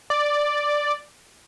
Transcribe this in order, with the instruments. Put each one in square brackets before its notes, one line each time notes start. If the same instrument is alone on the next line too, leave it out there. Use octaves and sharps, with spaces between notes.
[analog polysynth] D5